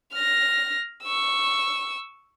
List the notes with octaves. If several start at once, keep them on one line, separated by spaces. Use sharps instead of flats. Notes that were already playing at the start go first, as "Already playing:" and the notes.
F6 A#6
C#6 E6